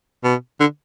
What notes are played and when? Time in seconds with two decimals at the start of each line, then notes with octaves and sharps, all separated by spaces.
0.24 B2
0.60 D3